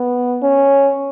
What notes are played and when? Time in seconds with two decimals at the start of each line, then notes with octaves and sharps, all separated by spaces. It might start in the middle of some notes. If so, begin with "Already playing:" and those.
Already playing: B3
0.43 C#4